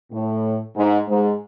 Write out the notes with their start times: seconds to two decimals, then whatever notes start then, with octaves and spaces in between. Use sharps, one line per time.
0.11 A2
0.75 G#2
1.08 G#2